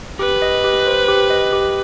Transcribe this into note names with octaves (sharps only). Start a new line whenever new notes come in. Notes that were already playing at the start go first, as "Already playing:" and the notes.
G4 B4
D#5
G4
C5
G4
D#5
G4